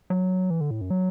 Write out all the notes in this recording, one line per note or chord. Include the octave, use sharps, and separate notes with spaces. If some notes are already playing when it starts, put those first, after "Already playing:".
F#3
E3
D3
A2
F#2
F#3